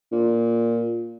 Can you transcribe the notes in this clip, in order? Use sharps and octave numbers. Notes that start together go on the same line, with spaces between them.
A#2